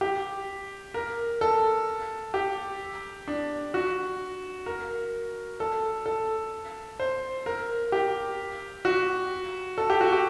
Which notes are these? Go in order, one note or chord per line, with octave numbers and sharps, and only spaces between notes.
G4
A#4
A4
G4
D4
F#4
A#4
A4
A4
C5
A#4
G4
F#4
A4
G4
F#4
G4